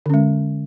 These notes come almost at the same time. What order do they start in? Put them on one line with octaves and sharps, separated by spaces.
D3 C#4 G#3